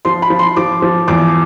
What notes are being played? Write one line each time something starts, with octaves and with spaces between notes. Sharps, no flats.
F3 C6
B5
F3
C6
F3 D6
F3
E2 D6